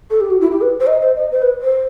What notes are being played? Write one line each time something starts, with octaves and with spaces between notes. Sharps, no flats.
A4
G4
F#4
E4
G4
B4
C5
D#5
C5
D#5
C5
B4
C5